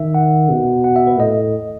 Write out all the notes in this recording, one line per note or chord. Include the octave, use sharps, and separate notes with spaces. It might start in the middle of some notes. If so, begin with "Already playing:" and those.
Already playing: D#3 E5
F#5
B2
F#5
E5
B4
A2 D#5